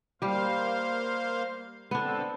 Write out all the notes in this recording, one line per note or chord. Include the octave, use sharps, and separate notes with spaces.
G3 A#3 G4 C5 F5
D3 B3 C4 D4 A4